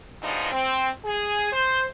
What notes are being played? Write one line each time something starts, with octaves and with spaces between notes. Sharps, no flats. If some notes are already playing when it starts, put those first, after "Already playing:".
G2 B2 F3 G#3 D4 D#4
C4
G#4
C5